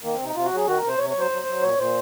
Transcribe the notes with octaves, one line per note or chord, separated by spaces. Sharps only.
D#3 A#3
C4
C3
D#4
C3 F4
F#4
F#3 G#4
D#3 F#4
A#4
C3 C5
C3 C#5
F#3 C#5
C5
F#3
F#3
A#2 C#5
A#2 C5